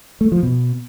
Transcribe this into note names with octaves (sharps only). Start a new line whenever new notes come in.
A3
F3
B2